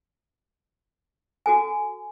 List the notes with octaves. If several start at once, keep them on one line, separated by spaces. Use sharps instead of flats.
F#4 A4 G#5